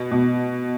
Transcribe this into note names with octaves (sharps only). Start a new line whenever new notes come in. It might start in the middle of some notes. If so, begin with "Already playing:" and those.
Already playing: B2
B2